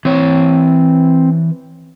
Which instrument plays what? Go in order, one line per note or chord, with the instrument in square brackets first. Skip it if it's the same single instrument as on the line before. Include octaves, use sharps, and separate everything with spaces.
[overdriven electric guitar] E3 C#5 [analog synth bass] C4